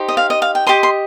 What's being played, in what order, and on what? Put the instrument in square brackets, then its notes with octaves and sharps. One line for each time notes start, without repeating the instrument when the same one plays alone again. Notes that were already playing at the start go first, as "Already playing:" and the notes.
Already playing: [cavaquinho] D#4 G4 C5
D#5
F5
D#5
F5
G5
G4 D#5 C6
C6